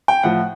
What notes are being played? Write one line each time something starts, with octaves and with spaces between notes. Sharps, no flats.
G5
A2 F3 F#5